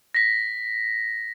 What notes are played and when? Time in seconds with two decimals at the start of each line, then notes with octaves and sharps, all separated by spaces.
0.15 A#6 B6